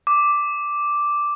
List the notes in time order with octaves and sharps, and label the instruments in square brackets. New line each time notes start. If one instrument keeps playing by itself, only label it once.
[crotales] D6